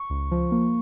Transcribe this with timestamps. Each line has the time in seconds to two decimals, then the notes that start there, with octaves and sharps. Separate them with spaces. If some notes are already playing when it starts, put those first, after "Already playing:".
Already playing: C#6
0.10 C#2
0.31 F3
0.52 A#3